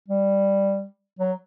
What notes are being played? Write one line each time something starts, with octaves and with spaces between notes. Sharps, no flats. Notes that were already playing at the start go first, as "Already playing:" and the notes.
G3
F#3